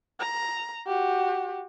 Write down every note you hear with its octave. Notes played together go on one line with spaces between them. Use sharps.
A#5
F#4 G4